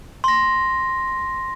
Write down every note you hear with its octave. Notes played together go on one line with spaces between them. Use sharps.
C6 A#6